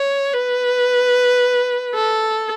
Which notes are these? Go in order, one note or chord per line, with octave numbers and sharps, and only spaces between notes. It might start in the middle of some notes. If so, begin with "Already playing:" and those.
Already playing: C#5
B4
A4